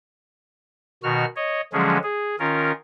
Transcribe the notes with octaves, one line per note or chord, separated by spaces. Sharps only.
B2 D#3 F#4 F6
C#5 D#5
D3 F3 F#3 G#3 C#4 G#4
G#4
D#3 C#4 F4 A#4